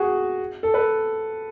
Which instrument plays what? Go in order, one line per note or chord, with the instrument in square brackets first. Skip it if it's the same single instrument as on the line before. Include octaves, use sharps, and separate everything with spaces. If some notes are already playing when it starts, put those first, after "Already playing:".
Already playing: [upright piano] F#4 G#4
A4
B4